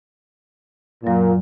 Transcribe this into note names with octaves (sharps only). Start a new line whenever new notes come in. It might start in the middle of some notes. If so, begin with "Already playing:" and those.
F#2 A#2 F#3